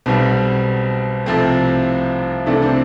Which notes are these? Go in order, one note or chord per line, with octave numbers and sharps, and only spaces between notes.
B1 B2 G3 C4
C2 C3 F3 A3 C4
C2 C3 E3 A3 D4
C4